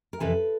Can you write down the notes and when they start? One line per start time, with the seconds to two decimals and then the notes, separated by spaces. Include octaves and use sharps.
0.13 A#4
0.20 F2 C3 E3 A4 B4